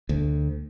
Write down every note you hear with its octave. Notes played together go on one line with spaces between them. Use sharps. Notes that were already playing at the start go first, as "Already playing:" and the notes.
D2